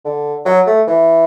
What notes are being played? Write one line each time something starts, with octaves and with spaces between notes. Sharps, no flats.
D3
F#3
A3
E3